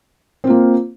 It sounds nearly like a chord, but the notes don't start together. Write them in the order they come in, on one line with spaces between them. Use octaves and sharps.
C4 F4 A#3